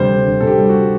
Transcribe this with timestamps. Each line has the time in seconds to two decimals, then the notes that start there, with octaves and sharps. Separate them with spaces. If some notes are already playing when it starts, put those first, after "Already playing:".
Already playing: D2 C3 G3 C5
0.10 D2
0.26 D2
0.40 C3 A4
0.47 G4
0.58 G3
0.69 F#4